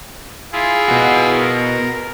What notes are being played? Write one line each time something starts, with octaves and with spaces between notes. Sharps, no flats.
E4 F4 G#4
B3 F#4
A#4